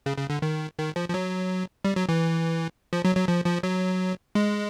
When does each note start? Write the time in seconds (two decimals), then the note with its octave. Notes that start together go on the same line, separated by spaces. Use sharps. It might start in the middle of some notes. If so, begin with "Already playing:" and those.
0.06 C#3
0.17 C#3
0.30 D3
0.42 D#3
0.78 D#3
0.96 F3
1.09 F3
1.14 F#3
1.85 G3
1.96 F#3
2.09 E3
2.93 F3
3.05 F#3
3.16 F#3
3.28 F3
3.46 F3
3.63 F#3
4.35 G#3